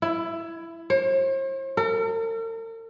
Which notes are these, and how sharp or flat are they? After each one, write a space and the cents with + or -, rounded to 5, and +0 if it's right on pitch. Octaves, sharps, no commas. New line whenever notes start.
E4 +15
C5 +45
A#4 -45